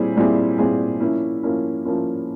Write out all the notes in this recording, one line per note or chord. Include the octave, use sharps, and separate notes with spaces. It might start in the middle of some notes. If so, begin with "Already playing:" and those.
Already playing: A#2 G3 C4 E4 G#4
A#2 G3 C4 E4 G#4
A#2 G3 C4 E4 G#4
F3 A#3 C#4 E4
F3 A#3 C#4 E4
F3 A#3 C#4 E4